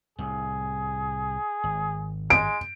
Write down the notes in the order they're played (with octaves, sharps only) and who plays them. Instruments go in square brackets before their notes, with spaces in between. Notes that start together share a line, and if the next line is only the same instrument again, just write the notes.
[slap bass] C2 A2 [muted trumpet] G#4
[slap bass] G#1
[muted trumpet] G#3 [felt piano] D7